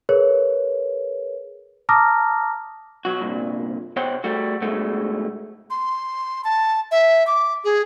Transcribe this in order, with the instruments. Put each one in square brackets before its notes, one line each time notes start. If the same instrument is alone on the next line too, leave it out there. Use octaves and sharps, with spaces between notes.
[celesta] G#4 A#4 B4 C#5
A5 A#5 D6 D#6 F6 A#6
[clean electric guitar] B1 F#3 F#4
C2 G2 A#2
B2 C5 C#5 F#5 G5
G3 A3 F#4
G2 B2 G#3 A3 F#4
[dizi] C6
A5
E5
D6
G#4